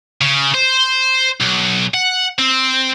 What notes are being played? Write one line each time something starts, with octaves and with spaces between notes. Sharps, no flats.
C#3
C5
B1
F#5
C4